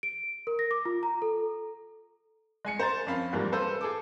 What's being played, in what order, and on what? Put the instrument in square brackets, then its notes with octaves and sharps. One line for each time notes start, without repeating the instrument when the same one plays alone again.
[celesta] D7
A#4
A#6
D6
F4
A#5
A4
[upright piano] G#3 G#5 C#7
C5 A#5 A6
F2 C#4 A#4 F5 B5
E2 G#2 F3 G3 A#3
A4 B4 C5 E6
G#4 A4 D6